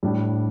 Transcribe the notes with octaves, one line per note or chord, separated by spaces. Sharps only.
A2 G3 D4